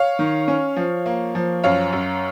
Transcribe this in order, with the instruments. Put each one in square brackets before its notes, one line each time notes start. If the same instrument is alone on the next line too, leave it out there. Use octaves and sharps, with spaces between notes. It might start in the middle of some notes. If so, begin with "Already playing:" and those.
Already playing: [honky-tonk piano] C#5 F5
D#3
C#4
F3
A#3
F3
F#2 C#5 F5
F#2